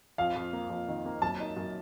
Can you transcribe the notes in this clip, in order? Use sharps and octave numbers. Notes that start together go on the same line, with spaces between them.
F2 F5
F2
A#3
F2
D#3
A#3
F#2 A5
D#4
F#2